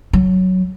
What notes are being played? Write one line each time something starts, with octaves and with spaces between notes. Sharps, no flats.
F#3